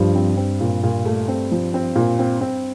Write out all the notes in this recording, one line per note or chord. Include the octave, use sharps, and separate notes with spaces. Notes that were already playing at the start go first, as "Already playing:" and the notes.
Already playing: G2 F3
C4
C4
A#2
A#2
A3
C4
F3
C4
A#2
C4
C4